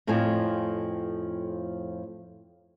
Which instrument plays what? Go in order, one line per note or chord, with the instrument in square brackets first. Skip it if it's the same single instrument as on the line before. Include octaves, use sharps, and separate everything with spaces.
[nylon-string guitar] F2 A2 F3 C4 G#5